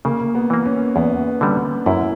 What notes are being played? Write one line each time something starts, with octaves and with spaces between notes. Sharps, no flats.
C#3 A#3
B3
E3 A#3
C#4
E2 B3
D3 G3 C#4
F#2 E4